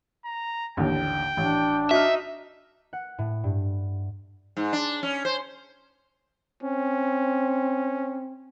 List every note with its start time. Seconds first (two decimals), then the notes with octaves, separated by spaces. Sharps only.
0.25 A#5
0.77 A1 D#2 D3 G5
1.37 A1 D4
1.91 D#4 F#4 D#5 E5 F6
2.93 F#5
3.19 A2
3.44 G2
4.57 G#2
4.73 D4
5.03 C#4
5.25 C5
6.63 C4 C#4